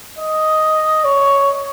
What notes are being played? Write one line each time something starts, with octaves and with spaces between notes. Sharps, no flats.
D#5
C#5